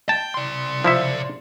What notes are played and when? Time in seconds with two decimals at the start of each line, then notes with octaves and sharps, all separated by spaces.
0.09 G5 A5
0.34 D5 C6
0.84 F3 E4 E5